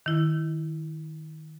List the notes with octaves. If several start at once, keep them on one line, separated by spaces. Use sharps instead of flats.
D#3 E4